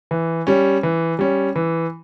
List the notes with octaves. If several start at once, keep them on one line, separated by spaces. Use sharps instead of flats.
E3
G3 C#4
E3
G3 C#4
E3